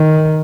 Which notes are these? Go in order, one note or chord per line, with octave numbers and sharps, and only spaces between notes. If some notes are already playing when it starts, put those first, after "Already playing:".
Already playing: D#3